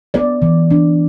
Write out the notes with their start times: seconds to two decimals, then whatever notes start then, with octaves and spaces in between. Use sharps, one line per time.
0.14 B3 D5
0.42 E3
0.71 D4